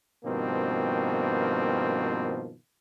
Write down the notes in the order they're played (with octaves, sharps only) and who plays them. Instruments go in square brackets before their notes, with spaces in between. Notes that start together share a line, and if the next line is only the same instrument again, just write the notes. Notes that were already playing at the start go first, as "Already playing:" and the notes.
[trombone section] G2 B2 D#3 F3 A#3 C4